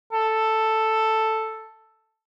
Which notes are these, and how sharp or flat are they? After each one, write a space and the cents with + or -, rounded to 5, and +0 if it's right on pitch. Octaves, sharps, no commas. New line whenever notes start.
A4 +5